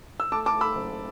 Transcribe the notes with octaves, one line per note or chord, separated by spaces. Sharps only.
E6
A3 A5 D6
A5 D6
A3
B5 E6
F#1